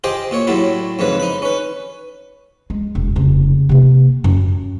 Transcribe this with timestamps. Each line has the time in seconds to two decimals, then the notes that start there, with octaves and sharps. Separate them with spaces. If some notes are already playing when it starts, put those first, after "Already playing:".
0.04 F4 G4 G#4 C5 D#5 G5
0.31 A#2 F4 C#5
0.47 A2 F#3 G3 E4 F4
0.99 F2 G#2 C#3 B4
1.20 D#4 B5
1.42 C#4 B4
2.70 G#3
2.95 E1
3.16 F1 C#3
3.69 C3 A#3
4.24 F#2